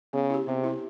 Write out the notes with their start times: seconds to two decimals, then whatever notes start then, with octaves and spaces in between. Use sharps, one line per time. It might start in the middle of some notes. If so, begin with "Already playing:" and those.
0.13 C#3 B3
0.30 E4 G4
0.47 C3 B3
0.64 E4 G4